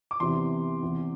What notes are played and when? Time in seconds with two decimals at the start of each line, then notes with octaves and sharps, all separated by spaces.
0.11 D6
0.20 E2 C3 E3 C6
0.83 E2 C3 E3